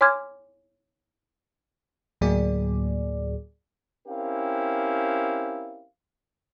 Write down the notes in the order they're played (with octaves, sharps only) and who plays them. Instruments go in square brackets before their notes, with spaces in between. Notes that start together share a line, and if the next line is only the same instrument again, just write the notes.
[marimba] C#5 G#5 C6 D6 F6 G#6
[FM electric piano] D2 A2 F#3 A#3 G#4 D5
[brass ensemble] C4 C#4 E4 G4 A#4 F5